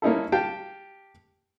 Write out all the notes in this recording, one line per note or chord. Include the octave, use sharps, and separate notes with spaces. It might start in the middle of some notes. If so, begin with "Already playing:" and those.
A#3 C#4 D#4 E4 A4
G4 F5 G5 A5